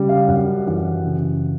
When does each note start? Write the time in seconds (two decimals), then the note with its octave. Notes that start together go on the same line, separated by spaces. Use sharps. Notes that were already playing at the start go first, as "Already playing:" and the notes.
Already playing: C#3 G3
0.09 F5
0.28 F#2 F#5
0.67 E3 F#5
1.06 C#3